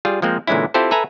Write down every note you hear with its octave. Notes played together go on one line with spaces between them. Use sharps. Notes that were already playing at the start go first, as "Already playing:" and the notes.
G3 F4 G#4
F3 G#3 A#3 C4
A#2 D3 E3 G#3 C#4 E4
C4 E4 F4 G4 A4 C5
A4 B4 E5 G#5 A#5